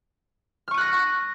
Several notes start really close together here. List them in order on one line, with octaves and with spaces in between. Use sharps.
F6 C#6 D#7 F#6 A#6